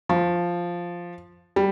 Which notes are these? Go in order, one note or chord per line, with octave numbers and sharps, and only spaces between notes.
F3
G3